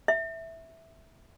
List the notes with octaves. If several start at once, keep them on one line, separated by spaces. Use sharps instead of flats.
E5